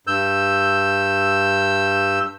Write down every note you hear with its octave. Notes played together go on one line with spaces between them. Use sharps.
G2 E6 G6